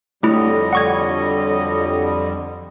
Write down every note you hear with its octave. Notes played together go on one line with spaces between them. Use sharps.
F2 D3 F#3 G3 A3 E4 C#5 D#5
F#5 C#6 G#6